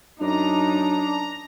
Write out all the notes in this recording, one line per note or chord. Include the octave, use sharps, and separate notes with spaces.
F#2 D4 D#4 A#5